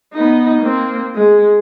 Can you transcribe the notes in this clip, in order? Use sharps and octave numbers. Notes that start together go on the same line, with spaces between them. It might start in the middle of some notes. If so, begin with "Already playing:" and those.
B3 D#4
A#3 C4
G#3